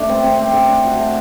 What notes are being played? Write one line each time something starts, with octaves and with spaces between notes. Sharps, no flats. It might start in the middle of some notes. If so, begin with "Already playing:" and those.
Already playing: A3 D4
C4
C4
C4
D3
D4
F#4
A3